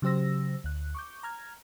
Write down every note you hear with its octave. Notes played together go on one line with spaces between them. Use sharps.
C#3 F#3 G4 C5 E6 A#6
D2 F#6
C#6 D6 G6
A#5 F6 G#6